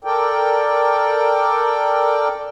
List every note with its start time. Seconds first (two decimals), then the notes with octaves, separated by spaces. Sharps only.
0.04 A4 A#4 D5 G5